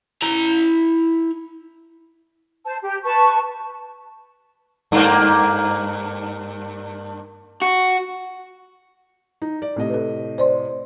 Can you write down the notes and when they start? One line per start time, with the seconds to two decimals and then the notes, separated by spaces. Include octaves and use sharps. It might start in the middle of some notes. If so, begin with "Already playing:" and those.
0.22 E4 A#5
2.65 C5 A5
2.82 G4
3.04 B4 A5 C#6
4.92 G2 A#3
7.62 F#4
9.42 D#4
9.62 D5
9.76 A2 C3 D#5
9.90 A4 B4
10.38 C5 D5 C6